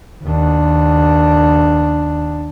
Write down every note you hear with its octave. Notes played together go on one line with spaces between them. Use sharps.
D#2 D4